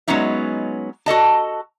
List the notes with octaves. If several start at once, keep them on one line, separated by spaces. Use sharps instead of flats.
F#3 G#3 B3 C#4 D#4 E5
F#4 A4 D#5 A5